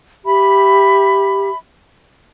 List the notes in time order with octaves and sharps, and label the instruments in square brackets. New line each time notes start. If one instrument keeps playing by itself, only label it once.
[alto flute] G4 [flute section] E5 B5